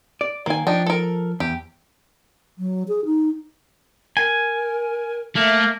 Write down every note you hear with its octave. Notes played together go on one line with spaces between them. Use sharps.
D5
D#3 A#3 A#4 G#5
F3 D4 D#4 G5
A4 A#4
E2 G4
F#3
G#4
D#4
A#4 G#5
A3 A#3 E5